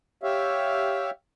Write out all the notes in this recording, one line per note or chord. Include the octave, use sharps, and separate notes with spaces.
G4 C#5 E5 F5